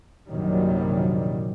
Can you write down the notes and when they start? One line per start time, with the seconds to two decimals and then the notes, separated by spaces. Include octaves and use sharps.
0.30 A#1 F#2 C3 D#3 F#3 G3